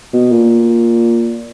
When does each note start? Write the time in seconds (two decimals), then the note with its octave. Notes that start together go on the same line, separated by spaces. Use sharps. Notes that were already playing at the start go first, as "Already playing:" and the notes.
0.13 B2
0.32 A#2